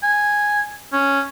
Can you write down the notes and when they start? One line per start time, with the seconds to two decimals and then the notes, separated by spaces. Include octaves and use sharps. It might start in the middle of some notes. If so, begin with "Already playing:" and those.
0.03 G#5
0.93 C#4